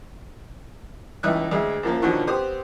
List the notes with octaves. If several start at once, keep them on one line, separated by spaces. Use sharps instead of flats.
C#2 E3 D#4 E5 G5 F#6
D2 G#3 E5
F#2 F3 A#3
B2 D3 D#3 F3 F#3
B3 C4 G4 C5 D#6